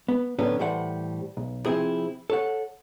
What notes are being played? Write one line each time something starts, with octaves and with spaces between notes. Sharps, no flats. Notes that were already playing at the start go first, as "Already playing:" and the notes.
B3
A2 D3 D#3 F#3 B3 C#4
A2 E3 G3 A3 C5 F#5
B1
C3 F3 C4 E4 G#4
A4 C#5 F#5